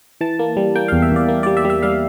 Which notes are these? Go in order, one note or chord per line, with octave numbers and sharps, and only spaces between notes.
E3 A5
A#3
G3
A#3 G5
E2 F5
E5
E2 D5
A#3
G3 D5
E5
G3
E5
G3 F5